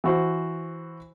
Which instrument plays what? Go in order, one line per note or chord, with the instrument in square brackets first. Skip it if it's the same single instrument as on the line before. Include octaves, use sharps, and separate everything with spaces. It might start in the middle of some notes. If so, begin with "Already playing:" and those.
[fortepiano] E3 F#4 C5